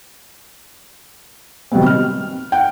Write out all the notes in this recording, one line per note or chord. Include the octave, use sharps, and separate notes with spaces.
C3 D#3 F#3 G3 B3 C4
F6
F#5 G5